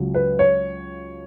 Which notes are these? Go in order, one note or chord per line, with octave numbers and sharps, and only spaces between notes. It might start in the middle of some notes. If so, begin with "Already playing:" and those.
Already playing: C#2 C#3 F#3
B4
C#5